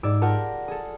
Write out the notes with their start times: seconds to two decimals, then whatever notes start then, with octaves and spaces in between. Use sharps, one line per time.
0.03 G#2 G4 D5 E6 G#6
0.22 F4 G4 A#4 F#5 A5
0.68 G#4 A4